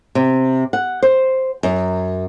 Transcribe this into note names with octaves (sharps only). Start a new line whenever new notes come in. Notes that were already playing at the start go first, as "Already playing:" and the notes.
C3
F#5
C5
F#2